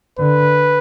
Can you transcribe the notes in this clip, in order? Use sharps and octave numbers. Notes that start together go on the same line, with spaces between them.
D3 B4